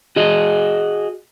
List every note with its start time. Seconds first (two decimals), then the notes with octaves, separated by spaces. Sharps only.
0.16 F#4 G#4 D#5